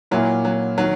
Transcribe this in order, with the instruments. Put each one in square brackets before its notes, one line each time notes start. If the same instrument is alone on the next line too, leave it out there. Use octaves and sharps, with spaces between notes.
[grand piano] A#2 A#3 E4 [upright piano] F#3
[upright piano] F#3
[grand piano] D#3 [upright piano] F#3